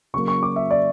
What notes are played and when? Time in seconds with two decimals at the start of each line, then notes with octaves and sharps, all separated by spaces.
0.14 C#3 F#3 A#3 C#6
0.28 C#6
0.43 D6
0.56 E5
0.71 D5